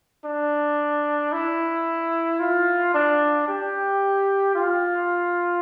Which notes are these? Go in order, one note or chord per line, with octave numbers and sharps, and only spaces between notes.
D4
E4
F4
D4
G4
F4